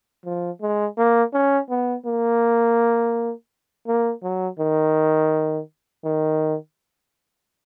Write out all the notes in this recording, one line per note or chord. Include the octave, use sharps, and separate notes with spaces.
F3
G#3
A#3
C#4
B3
A#3
A#3
F#3
D#3
D#3